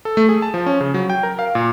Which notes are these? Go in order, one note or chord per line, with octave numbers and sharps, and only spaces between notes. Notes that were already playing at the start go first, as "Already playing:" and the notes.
A4
A3
G#4
A5
F3
C#4
C#3
F#3
G5
A#4
F5
A#2